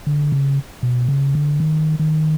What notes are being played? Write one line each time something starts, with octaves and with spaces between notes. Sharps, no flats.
D3
C#3
B2
C#3
D3
D#3
D#3